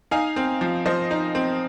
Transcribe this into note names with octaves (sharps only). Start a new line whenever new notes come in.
D#4 F5 G#5
C4
F3
F3 C5 D#5
D#4
C4